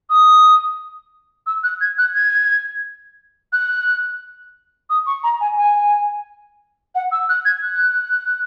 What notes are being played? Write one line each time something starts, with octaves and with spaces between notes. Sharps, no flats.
D#6
E6
F#6
G#6
F#6
G#6
F#6
D#6
C#6
A#5
G#5
G#5
F#5
E6
F#6
G#6
F#6